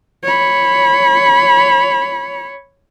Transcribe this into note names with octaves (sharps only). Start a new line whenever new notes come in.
C#5 B5